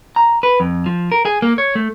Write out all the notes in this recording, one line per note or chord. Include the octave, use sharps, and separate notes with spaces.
A#5
B4
F2
F3
A#4
G#4
A#3
C#5
A3